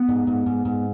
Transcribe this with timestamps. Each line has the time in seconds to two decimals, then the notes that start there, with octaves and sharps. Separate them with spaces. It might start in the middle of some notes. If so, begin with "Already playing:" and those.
Already playing: B3
0.09 G#2
0.27 G#2
0.46 G#2
0.65 G#2